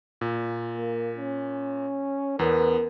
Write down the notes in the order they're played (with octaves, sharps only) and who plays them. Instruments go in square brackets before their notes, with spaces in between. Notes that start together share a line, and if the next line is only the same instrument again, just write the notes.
[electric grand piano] A#2
[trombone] A#3
C#4
[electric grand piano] E2 B3 B4 [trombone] A#4